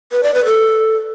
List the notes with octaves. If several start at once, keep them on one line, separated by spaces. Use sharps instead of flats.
B4
D5
B4
A4